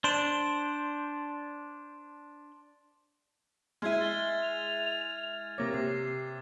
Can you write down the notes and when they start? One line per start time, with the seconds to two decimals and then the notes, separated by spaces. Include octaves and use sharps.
0.04 D4 C5 C6 D7 E7
3.82 G#3 E4 F6 G#6 D#7
4.01 A6 G7
4.42 F7
5.58 C3 A#3 C#5 D6 A#6
5.74 C3 D6 C7